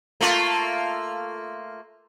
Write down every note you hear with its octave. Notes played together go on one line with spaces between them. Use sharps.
A3 A#3 F4